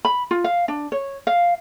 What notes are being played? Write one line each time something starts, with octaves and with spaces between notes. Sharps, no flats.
B5
F4
F5
D4
C#5
F5